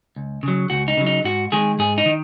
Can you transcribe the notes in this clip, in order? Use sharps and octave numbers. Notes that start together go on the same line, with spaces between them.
C#2
C#3 F#3
C#2 F#4
D#4
C#3 F#3
D#4
G#2 F#4
D#3 G#3 G#4
G#2 G#4
D#4
D#3